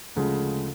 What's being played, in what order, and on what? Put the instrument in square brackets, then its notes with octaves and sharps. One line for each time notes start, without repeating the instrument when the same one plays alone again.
[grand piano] D2 C#3 F3 G#3